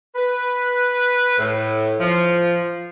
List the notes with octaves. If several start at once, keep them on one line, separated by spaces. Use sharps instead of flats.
B4
A2
F3